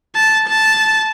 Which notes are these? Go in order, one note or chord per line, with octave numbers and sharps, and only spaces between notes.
A5
A5